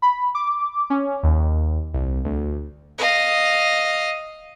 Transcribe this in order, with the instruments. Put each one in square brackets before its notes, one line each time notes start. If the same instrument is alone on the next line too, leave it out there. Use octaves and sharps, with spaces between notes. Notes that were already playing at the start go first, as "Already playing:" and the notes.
[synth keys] B5
D6
C#4
D#2
C2
D2
[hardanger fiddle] D#5 F5